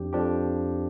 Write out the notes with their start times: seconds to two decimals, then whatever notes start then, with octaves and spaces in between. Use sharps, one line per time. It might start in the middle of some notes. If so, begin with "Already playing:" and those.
Already playing: F2 F3 D4 G4
0.13 F2 F3 D4 G4